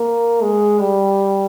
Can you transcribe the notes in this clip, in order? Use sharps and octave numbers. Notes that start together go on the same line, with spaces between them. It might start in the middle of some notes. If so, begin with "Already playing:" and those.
Already playing: A#3
G#3
G3